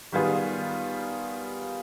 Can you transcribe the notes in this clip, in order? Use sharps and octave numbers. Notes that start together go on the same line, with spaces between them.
D#3 G3 B3 F4 G#4